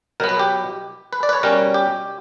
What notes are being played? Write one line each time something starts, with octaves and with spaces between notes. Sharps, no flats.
B2 F#3 B3 A#4
B4
G4
B4
D5
B4
C#5
B2 G3 C#4 A#4
G4